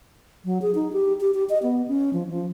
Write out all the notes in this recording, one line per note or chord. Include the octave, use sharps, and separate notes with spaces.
F#3
G#4
D#4
G4
G4
G4
D#5
B3
C#4
F3
F3